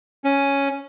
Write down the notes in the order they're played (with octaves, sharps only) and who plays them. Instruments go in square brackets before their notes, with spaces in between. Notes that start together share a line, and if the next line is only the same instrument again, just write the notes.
[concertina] C#4